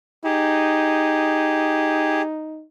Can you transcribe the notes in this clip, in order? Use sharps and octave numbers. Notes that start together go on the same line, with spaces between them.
D#4 G4 G#4